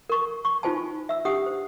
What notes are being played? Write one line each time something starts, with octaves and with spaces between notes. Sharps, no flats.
A#4 C#6
C#6
D#4 F4 C5 G#5 A5
E5 E6
D4 G4 F#5 D#6
C5